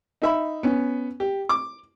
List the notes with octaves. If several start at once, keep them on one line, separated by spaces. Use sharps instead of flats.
D#4 E5 B5
B3 C#4
G4
D6